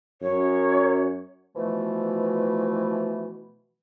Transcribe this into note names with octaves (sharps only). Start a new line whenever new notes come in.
F#2 C#5
B2 E3 F3 A3